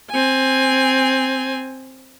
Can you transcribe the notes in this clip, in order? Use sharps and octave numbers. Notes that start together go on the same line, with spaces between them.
C4 G#5